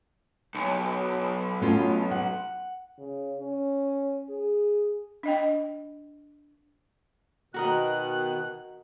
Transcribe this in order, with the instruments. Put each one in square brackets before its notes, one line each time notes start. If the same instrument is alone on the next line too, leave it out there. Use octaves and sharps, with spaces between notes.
[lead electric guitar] B1
[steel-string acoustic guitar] A3 C#4 F4
F#5
[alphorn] C#3
C#4
G#4
[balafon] D4 D#5 G5
[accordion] B2 D#3 F#6 [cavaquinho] F#4 A#4 D#5